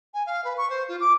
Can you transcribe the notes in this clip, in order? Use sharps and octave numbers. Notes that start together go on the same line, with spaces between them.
G#5
F5
B4
C#6
C5
F4
D6